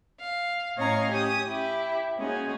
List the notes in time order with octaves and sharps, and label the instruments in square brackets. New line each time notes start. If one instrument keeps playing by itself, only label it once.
[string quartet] F5
A2 C#4 C#5 D#5 F5 A#5
C#4 G4 G#5 D#6
E4 G4
G#3 A#3 C#4 D#4 F#4 G#4